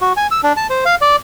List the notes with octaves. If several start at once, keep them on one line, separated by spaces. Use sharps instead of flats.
F#4
G#5
E6
D4
A5
C5
F5
D5